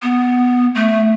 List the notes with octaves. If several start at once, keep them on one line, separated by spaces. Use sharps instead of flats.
B3
A3